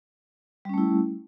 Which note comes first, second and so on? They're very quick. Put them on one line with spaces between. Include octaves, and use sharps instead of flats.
G3 C#4 A3 E4